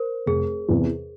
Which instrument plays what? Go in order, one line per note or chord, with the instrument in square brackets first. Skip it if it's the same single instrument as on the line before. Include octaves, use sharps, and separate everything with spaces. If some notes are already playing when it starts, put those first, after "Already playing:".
Already playing: [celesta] A#4 C5
[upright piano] F1 [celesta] G#4
[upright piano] E2 C3 E3